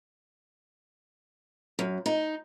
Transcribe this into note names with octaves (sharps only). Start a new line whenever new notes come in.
F#2
D#4